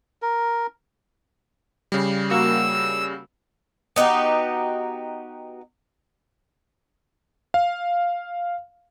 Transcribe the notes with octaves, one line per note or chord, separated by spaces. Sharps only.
A#4
C#3 G3
A#3 F#4 E6
B3 D#4 F#4 G4
F5